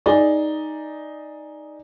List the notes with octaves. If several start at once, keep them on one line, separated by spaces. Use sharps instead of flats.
D#4 G#4 D5